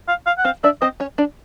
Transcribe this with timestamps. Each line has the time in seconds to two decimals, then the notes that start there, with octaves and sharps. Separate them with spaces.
0.08 F5
0.26 F5
0.38 F#5
0.44 C4 C5 F5
0.64 D4 D5 E5
0.81 C4 C5 D#5
1.00 C#4 C#5
1.18 D4 D5